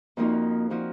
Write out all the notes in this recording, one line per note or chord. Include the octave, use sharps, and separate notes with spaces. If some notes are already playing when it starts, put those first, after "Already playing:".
F2 F3 A#3 D#4 F#4
F3 A#3 D#4 F#4